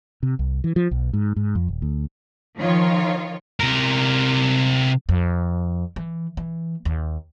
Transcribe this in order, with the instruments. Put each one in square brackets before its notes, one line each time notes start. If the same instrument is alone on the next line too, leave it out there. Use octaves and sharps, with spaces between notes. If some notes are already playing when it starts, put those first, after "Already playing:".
[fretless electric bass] C3
C2
E3
F3
B1
G#2
G#2
F2
D#1
D2
[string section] D#3 F3 F4 C#5
[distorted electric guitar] C3 A#4
[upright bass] F2
E3
E3
D#2